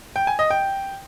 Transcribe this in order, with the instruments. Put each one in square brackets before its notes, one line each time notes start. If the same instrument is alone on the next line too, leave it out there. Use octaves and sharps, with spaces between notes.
[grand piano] G5
G#5
D#5
G5